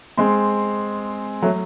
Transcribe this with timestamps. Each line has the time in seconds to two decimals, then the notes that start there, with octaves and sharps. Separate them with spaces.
0.17 G#3 C4
1.42 F#3 A3